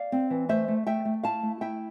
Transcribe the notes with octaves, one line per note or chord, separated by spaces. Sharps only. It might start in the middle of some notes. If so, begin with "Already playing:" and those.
Already playing: D5 F5
C4
E3
A3 C5 E5
A3
A3 E5 G5
A3
E4 F5 A5
A3
E4 E5 G5